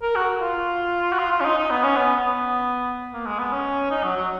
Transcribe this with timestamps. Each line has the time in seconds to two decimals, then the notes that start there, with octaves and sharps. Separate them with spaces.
0.02 A#4
0.16 F#4
0.41 F4
1.12 F#4
1.19 F4
1.31 F4
1.41 C#4
1.45 D#4
1.58 D#4
1.70 B3
1.83 C#4
1.96 B3
2.16 B3
3.13 A#3
3.26 G#3
3.39 B3
3.52 C#4
3.91 D#4
4.04 F#3
4.16 F#3